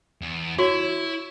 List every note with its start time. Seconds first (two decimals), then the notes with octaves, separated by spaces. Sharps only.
0.21 E2
0.59 E4 F#4 C#5